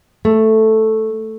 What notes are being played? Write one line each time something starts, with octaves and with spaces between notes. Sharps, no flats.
A3